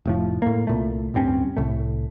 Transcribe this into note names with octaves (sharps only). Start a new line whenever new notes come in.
F1 A2 F3
A2 A#3
C2 A#2 A3
D1 G2 C4 C#4
C2 A2 A3